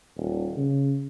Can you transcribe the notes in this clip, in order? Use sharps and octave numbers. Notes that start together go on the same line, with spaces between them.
D#1
C#3